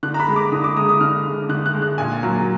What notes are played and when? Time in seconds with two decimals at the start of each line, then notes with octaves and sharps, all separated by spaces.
0.03 D3 F#6
0.14 A#5
0.20 B5
0.28 G#3
0.36 D6
0.52 D3 D#6
0.64 D6
0.77 G#3 D#6
0.89 D#6
1.01 D3 F6
1.26 G#3
1.49 D3 F#6
1.66 F#6
1.74 G#3
1.82 F#6
1.98 A#2 G#5
2.23 F#3 A#3